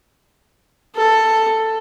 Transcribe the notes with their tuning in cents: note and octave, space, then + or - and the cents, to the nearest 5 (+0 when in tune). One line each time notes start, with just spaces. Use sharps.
A4 +10